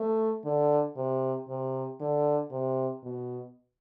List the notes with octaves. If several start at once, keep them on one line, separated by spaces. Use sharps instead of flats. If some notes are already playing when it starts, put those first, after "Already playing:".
Already playing: A3
D3
C3
C3
D3
C3
B2